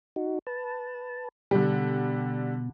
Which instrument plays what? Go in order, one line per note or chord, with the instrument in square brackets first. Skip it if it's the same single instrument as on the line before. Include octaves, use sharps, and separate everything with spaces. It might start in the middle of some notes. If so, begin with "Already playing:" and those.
[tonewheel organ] D#4 F#4
B4 A5
[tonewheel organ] B2 [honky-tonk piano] D3 G3